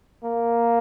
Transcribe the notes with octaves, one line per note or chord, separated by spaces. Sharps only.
A#3